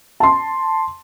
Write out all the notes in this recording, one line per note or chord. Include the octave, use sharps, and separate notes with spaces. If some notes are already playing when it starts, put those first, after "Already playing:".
A5 C6